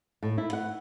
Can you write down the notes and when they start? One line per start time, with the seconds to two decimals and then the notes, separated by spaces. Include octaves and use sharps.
0.23 A2
0.38 E4
0.53 F#5